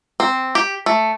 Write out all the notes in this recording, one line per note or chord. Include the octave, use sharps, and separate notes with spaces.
C4
G4
A3